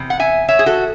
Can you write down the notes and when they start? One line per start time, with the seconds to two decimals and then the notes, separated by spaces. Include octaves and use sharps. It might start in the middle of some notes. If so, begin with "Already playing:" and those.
Already playing: E2 C3
0.10 F#5
0.20 E5 G#5
0.48 C#5 E5
0.59 G#4
0.66 F#4 A4